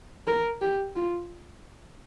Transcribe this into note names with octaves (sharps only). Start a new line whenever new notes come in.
A#4
G4
F4